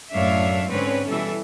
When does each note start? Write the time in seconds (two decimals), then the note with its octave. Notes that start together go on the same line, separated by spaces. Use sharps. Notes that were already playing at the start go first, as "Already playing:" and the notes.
0.13 F#2 A2 D4 C#5 E5 F5
0.70 G#2 D3 C4 C#4 B4 C#5
1.08 B2 E3 G3 A4 E5